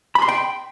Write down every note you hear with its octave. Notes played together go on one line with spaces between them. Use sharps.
B5
C6
G5